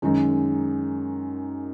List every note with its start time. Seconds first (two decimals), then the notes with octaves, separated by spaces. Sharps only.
0.02 F#2 D#3 G#3 D#4 G#4